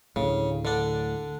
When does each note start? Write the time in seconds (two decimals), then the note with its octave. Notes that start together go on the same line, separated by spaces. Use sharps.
0.16 D2 A2 C#3
0.65 D3 D4